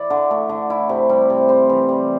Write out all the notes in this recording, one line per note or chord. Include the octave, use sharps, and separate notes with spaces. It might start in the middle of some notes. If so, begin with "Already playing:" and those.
Already playing: E4 D5
D3
A3
D3
E4
C3
G3
C3
C4 C5
E3
G3